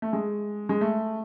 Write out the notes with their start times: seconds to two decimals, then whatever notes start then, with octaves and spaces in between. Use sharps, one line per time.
0.02 A3
0.13 G#3
0.69 G#3
0.81 A3